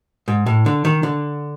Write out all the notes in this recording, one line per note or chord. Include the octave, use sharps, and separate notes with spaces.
G#2
A2
D3
D#3
D3